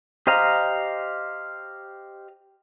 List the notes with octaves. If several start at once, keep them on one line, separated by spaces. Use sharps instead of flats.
G4 C5 D#5 F5 A#5